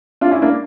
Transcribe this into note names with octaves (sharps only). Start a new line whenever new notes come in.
D4 F4
C#4 E4
A#3 D4